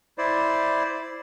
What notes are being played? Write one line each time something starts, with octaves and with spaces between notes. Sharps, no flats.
E4 C5 D5